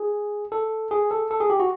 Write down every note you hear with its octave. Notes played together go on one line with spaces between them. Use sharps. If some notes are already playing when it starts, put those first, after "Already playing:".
Already playing: G#4
A4
G#4
A4
A4
G#4
G4
F#4